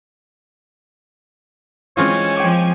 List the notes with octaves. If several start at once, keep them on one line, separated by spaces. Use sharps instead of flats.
E3 G#3 C4 C#4 F4 C#5
F3 G5 G#5 D6